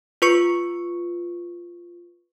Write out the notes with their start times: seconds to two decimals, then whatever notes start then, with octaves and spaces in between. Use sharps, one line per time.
0.22 F4 B4 C#6 C#7